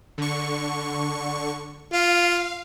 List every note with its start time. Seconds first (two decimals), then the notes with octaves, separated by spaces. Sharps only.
0.18 D3 C#6
1.93 F4 F5